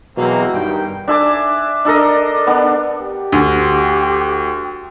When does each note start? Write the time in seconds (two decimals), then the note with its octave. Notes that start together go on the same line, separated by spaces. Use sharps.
0.17 B2 E3 F#3 G#3 A#3 C4
0.52 G2 D#3 G5
1.08 D4 E5 G#5 D6
1.85 D4 A4 A#4 D#5
2.47 B3 D4
3.01 G4
3.32 D2